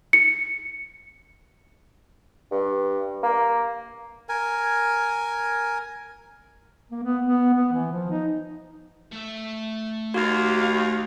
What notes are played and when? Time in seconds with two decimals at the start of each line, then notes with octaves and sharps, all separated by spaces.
0.13 C#7
2.51 G2
3.23 A#3
4.29 A#4 G#5
6.91 A#3
7.04 B3
7.26 B3
7.54 B3
7.73 E3
7.92 F3
8.10 D#4
9.12 A3 E5
10.14 D#2 F#4 F5